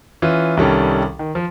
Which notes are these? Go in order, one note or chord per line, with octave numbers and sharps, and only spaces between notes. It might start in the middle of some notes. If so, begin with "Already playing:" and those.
E3 C#4 F4
C2 D#3 G3 C#4 A4
D#3
F3